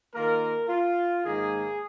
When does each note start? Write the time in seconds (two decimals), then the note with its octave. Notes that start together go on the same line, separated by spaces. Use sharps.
0.15 D#3 A#3 F4 A#4
0.69 F4
1.25 G#2 D#3 A#3 G#4